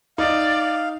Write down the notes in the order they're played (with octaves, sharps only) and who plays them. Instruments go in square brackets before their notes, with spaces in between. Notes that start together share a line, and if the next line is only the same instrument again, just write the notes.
[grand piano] D#4 [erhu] D5 [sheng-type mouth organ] F5